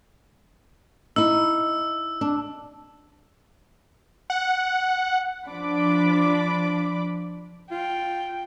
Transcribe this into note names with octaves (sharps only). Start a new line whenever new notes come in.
D#4 E4 E6
D4
F#5
F3 D4 B5 D6
F4 G5